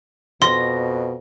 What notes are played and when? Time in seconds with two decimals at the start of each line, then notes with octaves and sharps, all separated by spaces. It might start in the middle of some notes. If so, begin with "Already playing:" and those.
0.42 F2 B2 C6 A#6